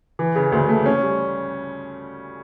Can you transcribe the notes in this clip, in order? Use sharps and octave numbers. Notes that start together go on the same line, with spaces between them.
E3
C#3
D2
A3
C#4
G3